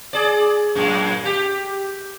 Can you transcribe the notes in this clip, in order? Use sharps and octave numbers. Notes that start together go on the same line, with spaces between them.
G#4 D5
F#2 A#2 G#3
G4